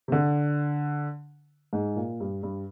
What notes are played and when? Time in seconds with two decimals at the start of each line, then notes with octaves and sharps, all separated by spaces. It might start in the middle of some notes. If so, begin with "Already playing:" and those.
0.08 C3
0.12 D3
1.73 G#2
1.96 A#2
2.20 G2
2.43 G2